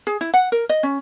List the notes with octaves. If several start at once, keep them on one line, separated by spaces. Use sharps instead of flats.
G#4
E4
F#5
A#4
D#5
C#4